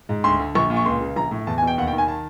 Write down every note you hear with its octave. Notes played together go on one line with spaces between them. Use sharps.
G#2
D2 C6
D3
A#1 C#6
A#2
C#6
C#2 C6
C#3
A#1 A#5
A2
E2 A5
G#5
B2
G5
D#2 F#5
G5
D#3
G#5
A5